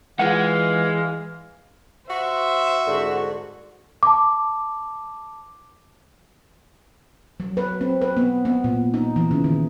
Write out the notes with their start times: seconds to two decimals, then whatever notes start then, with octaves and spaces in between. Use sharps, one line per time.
0.19 E3 G#3 F4 B4 F5 F#5
2.10 F#4 C5 E5
2.87 C2 G#2 D3
4.03 A5 D6
7.40 F#3
7.57 B4
7.81 C4
8.01 B4
8.17 B3
8.45 B3
8.64 A#2
8.94 D#4
9.16 E3
9.31 C#3
9.44 D#3